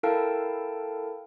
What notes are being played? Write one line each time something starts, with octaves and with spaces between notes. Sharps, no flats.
E4 A4 A#4 F5 G5 A5